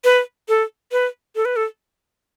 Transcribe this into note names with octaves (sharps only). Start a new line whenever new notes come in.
B4
A4
B4
A4
B4
A4